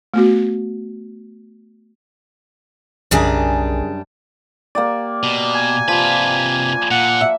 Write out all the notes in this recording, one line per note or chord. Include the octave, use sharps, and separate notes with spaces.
A3 B3 F#4
B1 F#2 C#3 G3 D4 G#4 A#4
A#3 G4 D5
B2
G#5
C3 F3 B4
A#2 F#5
E5